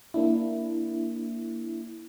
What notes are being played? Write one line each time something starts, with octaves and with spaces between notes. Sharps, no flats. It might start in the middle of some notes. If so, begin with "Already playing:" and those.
A#3 D4 E4